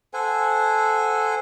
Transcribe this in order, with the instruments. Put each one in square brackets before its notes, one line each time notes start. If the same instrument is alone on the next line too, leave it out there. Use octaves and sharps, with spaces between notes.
[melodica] A4 C5 F#5 G#5